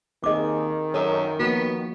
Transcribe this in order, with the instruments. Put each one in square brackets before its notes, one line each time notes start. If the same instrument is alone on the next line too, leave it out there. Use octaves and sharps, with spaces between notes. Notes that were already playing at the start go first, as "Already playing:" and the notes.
[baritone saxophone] D#2 [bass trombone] D#3 [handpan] C4 G#4 [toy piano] D#5 D6
[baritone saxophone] F#2 [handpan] A4 C#5
[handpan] F3 A#3 F#4 [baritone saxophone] B3